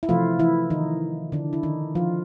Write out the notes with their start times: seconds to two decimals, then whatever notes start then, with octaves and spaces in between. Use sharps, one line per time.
0.03 E4
0.09 C3 E3 F3 A3 F4
0.39 E3 E4
0.70 D#3 D#4
1.32 D3 D4
1.53 E4
1.63 D#3 D#4
1.95 F3 F4